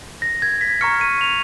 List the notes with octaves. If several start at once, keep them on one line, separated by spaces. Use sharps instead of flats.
A#6
G#6
B6
A#5 C#6 F6 C#7
D#7
F7